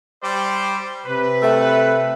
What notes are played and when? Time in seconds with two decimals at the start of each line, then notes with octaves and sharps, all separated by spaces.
0.22 G3 C5 D5
1.06 C3 B4
1.42 A3 E5 G5 E6